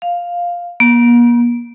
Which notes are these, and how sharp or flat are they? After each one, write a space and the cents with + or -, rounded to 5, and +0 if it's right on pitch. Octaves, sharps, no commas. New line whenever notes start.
F5 +5
A#3 +45